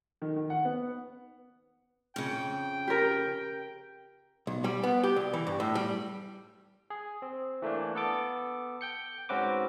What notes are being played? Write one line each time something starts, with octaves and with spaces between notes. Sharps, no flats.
D#3
D#3
F#5
B3
F2 C#3 G5
G4 A#4
B1
G3
B3
G4
C2
E3
G2
A2
G3
G#4
C4
E3 A3 A#3 D4
B3 A4 D6
G5 G6 C#7
G#2 C4 C#4 F#4 B4 D6